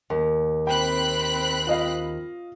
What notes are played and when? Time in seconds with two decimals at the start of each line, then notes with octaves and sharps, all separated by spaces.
0.10 D#2
0.67 C4 G5 B5 F#6
1.67 F4 D#5 F5